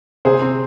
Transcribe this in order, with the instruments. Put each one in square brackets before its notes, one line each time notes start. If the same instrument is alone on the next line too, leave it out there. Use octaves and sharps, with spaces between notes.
[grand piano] C3 [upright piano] G#4 C5
[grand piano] C4